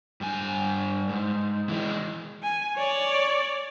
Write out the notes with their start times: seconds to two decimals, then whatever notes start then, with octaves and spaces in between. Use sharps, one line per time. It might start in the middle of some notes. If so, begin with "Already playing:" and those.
0.21 G2 G#5
1.09 G#2
1.69 E3 G#3
2.43 G#5
2.76 C#5 D5